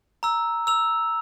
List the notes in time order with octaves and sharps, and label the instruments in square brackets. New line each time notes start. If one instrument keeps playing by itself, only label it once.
[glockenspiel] A#5 E6
E6 F7